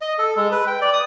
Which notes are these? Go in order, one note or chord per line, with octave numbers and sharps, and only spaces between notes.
D#5
A4
G#3
B4
G5
D5
D#6